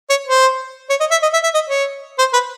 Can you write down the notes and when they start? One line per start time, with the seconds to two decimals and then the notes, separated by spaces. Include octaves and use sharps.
0.10 C#5
0.27 C5
0.90 C#5
1.00 D#5
1.11 E5
1.22 D#5
1.33 E5
1.43 E5
1.54 D#5
1.69 C#5
2.18 C5
2.33 B4